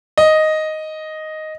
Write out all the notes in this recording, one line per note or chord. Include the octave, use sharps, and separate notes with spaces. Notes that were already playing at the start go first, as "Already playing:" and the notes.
D#5